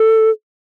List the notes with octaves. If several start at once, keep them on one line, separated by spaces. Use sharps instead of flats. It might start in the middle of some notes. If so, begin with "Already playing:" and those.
Already playing: A4